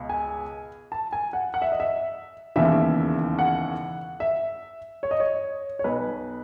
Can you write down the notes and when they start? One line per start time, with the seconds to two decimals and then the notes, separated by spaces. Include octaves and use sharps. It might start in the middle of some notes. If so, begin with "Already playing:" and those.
Already playing: C#2 B2
0.09 G#5
0.92 A5
1.13 G#5
1.33 F#5
1.54 F#5
1.62 E5
1.72 D#5
1.80 E5
2.56 E1 D#2 C#3 E3 E5
3.39 F#5
4.20 E5
5.03 C#5
5.11 D#5
5.20 C#5
5.79 C#5
5.84 B1 B2 B4